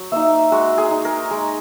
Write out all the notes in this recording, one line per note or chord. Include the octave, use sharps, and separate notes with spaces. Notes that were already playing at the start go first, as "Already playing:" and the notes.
Already playing: F#3
A#3 D#4 E5
G#3 F#4
G#4
D#4
A#4
G#3